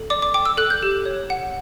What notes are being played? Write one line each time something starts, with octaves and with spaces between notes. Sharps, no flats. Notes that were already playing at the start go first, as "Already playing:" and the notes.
Already playing: A4
D5 D6
D6
G5 D6
E6
A4 F#6
G6
G4
C#5
F#5